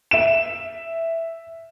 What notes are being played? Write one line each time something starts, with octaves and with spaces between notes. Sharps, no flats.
E5 E7